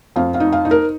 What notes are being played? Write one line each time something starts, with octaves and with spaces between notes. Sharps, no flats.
F2 F5
F5
D#4
F5
D#4
A#4